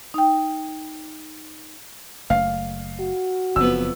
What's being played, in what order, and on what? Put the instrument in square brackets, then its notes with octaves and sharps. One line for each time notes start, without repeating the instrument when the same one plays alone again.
[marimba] D#4 G5
[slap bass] F#1 A3 [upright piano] F5
[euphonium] F#4
[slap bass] F#1 [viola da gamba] F2 B3 [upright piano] E6